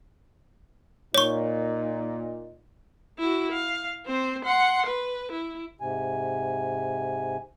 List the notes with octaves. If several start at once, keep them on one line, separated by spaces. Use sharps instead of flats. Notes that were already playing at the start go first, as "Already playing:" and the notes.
A#2 D#4 C#5 C#6
E4 F#4
F5
C4 C5
F#5 C6
B4
E4
G#2 C3 G#5